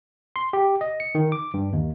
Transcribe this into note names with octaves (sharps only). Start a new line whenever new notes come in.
C6
G4
D#5
C#7
D#3
D6
G2
D#2